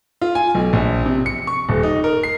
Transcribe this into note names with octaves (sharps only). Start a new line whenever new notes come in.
F4
G#5
B1
A#1
C3
C#7
C#6
D#1
D#4
A#4
C7